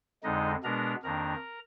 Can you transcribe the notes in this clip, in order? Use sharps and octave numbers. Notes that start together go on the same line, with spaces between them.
F2 D3 G#3 D#4 D#5
B2 G#3 B3 D4 A#4 A#5
F2 D#3 A#3 D4 A#4 A#5